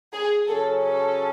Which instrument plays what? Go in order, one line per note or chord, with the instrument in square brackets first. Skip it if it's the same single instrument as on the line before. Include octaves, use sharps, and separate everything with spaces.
[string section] G#4
[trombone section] C#3 F#3 C#4 [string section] A4
[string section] A4